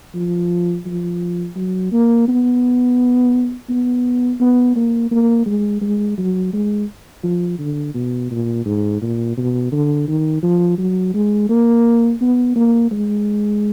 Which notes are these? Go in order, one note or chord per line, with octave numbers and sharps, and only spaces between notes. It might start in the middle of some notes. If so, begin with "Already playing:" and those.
F3
F3
F#3
A#3
B3
B3
B3
A#3
A#3
G#3
G#3
F#3
G#3
F3
D3
B2
A#2
G#2
A#2
B2
D3
D#3
F3
F#3
G#3
A#3
B3
A#3
G#3